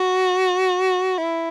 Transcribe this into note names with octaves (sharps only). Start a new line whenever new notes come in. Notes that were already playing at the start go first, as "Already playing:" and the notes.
Already playing: F#4
E4